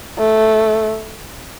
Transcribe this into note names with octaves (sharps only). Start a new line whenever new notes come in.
A3